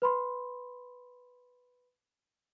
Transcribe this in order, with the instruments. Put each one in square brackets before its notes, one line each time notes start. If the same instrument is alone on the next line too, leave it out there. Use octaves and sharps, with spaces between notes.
[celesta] B4 B5 C6